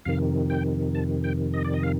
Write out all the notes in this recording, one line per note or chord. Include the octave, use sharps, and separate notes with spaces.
F2 C3 D#3 F5
G5
A5
G5
D#5
D5
D#5
F5